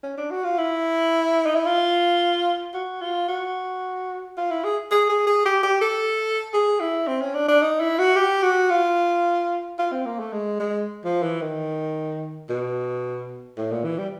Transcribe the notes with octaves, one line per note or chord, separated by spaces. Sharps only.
C#4
D4
F#4
F4
E4
D#4
E4
F4
F#4
F4
F#4
F4
E4
G#4
G#4
G#4
G#4
G4
G4
A4
G#4
E4
C4
C#4
D4
D4
D#4
E4
F#4
G4
F#4
F4
F4
C4
A#3
A3
G#3
G#3
F3
E3
D#3
B2
A2
A#2
E3
G3